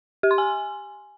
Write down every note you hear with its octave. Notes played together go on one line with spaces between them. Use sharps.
G4
C6
G#5